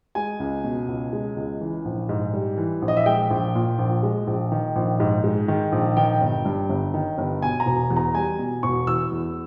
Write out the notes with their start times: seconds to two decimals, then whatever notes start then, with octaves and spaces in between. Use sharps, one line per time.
0.15 G#3 G#5
0.40 C#2
0.64 B2
0.88 C#2
1.13 G#3
1.36 C#2
1.61 E3
1.85 A#1
2.09 G#2
2.33 G3
2.57 E3
2.82 A#1
2.88 D#5
2.97 E5
3.06 G#3 G5
3.30 A#1
3.55 A#2
3.79 A#1
4.03 G#3
4.27 A#1
4.52 D#3
4.76 A#1
5.00 G#2
5.24 G#3
5.48 D#3
5.72 A#1
5.97 D#3 G5
6.21 G1
6.45 G2
6.69 G1
6.94 D#3
7.18 G1
7.42 B2 G#5
7.60 A#5
7.66 E1
7.90 E2
7.96 A#5
8.15 G3 G#5
8.39 B2
8.63 E1 C#6
8.87 E3 E6
9.12 E2